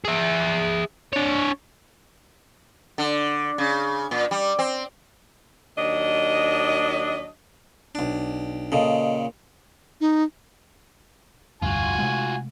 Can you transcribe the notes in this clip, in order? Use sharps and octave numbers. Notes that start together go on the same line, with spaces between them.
G#4 E5
D4 C#5
D3
C#3
A#2
G3
C4
D#2 F#3 D4 D#5
B1 D4
A#2 C#3 A4 D#5
D#4
F1 D2 G2 F4 F#4 G#5
C3 G#3 A3